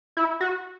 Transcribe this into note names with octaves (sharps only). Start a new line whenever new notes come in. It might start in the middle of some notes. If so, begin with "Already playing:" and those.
E4
F#4